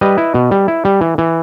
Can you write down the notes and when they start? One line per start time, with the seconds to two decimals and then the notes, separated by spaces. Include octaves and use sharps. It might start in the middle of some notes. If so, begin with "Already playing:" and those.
0.01 G3 B4 D#5
0.18 E4
0.34 B2
0.51 G3
0.68 E4
0.85 G3
1.01 E3
1.18 E3